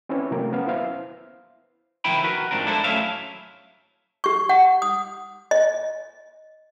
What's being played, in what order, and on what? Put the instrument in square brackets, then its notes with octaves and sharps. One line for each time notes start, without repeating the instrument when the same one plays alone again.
[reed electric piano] C4 C#4 E4 B4 C#5 D5
C3 F#3 A3 A#3 C4 A#4
B3 C#4 F5
E4 B4 C5 E5 F5
[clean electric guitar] B1 D#3 F3 E4 G5 B5
F#4 A#4 B4
G#2 F3 C4 D4 A#4
D4 E4 A4 A#4 C5
F#3 A3 C#4 E4 E5 F5
[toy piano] G4 C#6
F#5
D#6
D#5